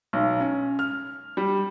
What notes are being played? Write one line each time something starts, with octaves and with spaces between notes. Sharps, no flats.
B1
C#4
F6
G3